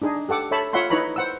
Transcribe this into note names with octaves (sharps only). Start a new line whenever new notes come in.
D4 D#4 G#4
G4 A4 F#5 D6 E6
A4 C#5 E5 A5 B5
F4 C#5 E5 F#5 B5 C6
D#4 E4 B4 C#5 A#5 B5
C5 F#5 E6